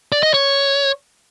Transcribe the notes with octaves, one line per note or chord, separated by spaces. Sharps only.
D5
D#5
C#5